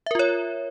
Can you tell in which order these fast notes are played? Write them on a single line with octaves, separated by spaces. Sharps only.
E5 A#4 F4 C#5